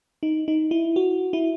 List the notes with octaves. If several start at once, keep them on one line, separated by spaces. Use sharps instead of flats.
D#4
D#4
E4
F#4
E4